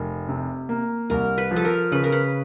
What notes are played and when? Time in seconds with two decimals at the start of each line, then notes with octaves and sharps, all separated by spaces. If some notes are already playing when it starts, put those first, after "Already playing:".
Already playing: F1 A#4
0.28 C3
0.69 A#3
1.10 C2 A#4
1.38 B4
1.51 F3
1.56 A4
1.65 A#4
1.92 C#3 B4
2.04 A#4
2.12 B4